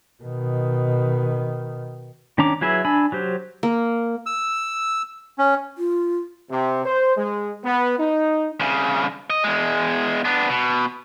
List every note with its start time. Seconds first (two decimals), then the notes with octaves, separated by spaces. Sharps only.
0.23 B2 D#3
2.38 D#3 C#4 D4 A#5 D6
2.61 F#3 E4 G#4 B4 E5
2.85 D4 G#5 B5 E6
3.12 F#3 G4 C5
3.63 A#3
4.26 E6
5.39 C#4
5.78 F4
6.51 C3
6.86 C5
7.17 G#3
7.64 B3
7.98 D#4
8.60 C2 C#3
9.30 D#5
9.44 E2 G#3
10.25 B3 D4
10.50 B2